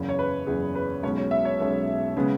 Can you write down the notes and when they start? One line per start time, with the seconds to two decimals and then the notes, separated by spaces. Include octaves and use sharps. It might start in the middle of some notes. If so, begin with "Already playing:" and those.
Already playing: F#1 E2 C#3
0.09 C#5
0.19 B4
0.47 F#1 E2 C#3 G#4
0.75 B4
1.03 B1 B2 G#3 C#4 C#5
1.18 C#5
1.31 E5
1.45 C#5
1.59 B1 B2 G#3 C#4
2.17 C#3 G#3 B3